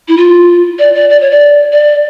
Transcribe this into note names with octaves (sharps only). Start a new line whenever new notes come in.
E4
F4
D5
D5
D5
C#5
D5
D5